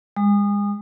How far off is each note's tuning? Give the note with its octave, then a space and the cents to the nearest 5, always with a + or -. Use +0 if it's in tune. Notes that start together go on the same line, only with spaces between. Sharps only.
G#3 -35 D#6 -25